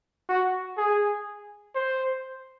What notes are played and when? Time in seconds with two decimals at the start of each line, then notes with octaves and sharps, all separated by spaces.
0.29 F#4
0.77 G#4
1.75 C5